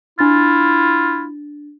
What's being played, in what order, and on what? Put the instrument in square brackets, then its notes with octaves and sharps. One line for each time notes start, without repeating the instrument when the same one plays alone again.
[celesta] D4 A6 [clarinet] E4 [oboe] F4